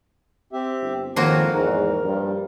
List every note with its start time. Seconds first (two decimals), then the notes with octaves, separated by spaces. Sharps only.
0.53 C4 G4 E5
0.81 G1
1.16 F2 G#2 D#3 F3 A#3 F#4 C#5 A5
1.54 E2 G#2 A#4
2.04 G2 G3